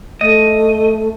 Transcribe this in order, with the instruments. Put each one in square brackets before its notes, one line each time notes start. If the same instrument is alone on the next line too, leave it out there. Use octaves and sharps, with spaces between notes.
[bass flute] A3 [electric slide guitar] D#5